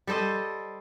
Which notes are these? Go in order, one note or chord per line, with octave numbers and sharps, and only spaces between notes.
G3 A4 C5 D#5